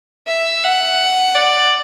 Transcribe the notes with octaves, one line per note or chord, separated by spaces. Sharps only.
E5
F#5
D5